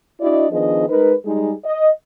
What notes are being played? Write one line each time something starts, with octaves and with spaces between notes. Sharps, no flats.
D4 E4 F#4 D5 D#5
D#3 F3 B3 D4 G#4 D#5
G#3 D#4 A#4 B4
G3 G#3 D#4 G#4
D#5